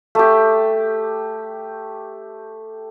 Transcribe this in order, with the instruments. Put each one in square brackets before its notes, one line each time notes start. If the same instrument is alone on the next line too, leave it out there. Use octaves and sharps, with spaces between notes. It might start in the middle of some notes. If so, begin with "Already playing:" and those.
[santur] A3 G4